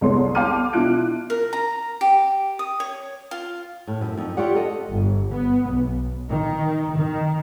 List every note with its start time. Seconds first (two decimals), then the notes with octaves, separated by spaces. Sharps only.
0.01 C2 G#3 B3 A4 C#5 C6
0.35 F5 G5 A5 D6 F6 D#7
0.73 B2 D4 E4 F4 F#6 D7
1.30 A#4
1.53 A#5
2.01 G4
2.59 D#6
2.80 C#5
3.31 F4
3.87 A2
4.01 F#2
4.17 F2 D#4
4.37 F4 G4 C#5 D5 F#5
4.55 A4 D#5 F#5
4.91 G1
5.33 B3
5.69 B1
6.30 D#3
6.95 D#3